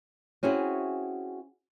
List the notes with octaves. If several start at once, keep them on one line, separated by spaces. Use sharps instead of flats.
C4 C#4 E4 F#4 G#4